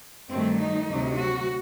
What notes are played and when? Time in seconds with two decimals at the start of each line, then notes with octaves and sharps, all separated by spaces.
0.30 G2 D#3 F#3 A3 C4
0.60 D#4
0.89 D2 C3 F#3
1.18 F#4